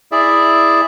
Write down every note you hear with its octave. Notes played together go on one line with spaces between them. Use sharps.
E4 G#4 D5 E5